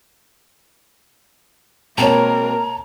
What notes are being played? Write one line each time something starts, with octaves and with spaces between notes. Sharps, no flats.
B2 G#3 A#3 C4 A#4 C#5 A5 A#5